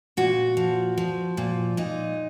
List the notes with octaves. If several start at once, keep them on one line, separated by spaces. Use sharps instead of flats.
A#2 F#4
F3
F3
A#2
A#2 D#4